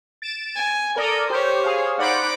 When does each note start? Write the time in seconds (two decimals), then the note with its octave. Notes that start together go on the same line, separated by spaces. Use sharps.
0.22 A6 D7 E7
0.55 G#5
0.96 A4 A#4 D5 D#6
1.30 G4 C5 C#5
1.64 G#4 F5
1.98 D#4 C5 D5 F#5 B5 D6